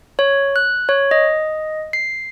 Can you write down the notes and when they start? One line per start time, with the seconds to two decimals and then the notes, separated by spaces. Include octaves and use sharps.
0.19 C#5
0.56 F#6
0.89 C#5
1.11 D#5
1.93 C7